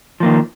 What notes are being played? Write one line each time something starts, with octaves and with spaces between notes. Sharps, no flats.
D#3 F3 A#3